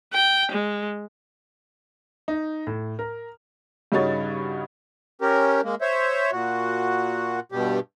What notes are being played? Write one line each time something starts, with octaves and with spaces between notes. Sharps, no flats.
G5
G#3
D#4
A2
A#4
G2 C#3 D#4 F#4 C#5 A6
C#4 G4 A#4
G#3 A#3
C5 C#5 E5
A#2 F#4
G2 B2 G3 G4